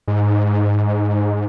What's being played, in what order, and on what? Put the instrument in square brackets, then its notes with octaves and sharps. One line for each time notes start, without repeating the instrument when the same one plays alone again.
[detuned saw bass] G#2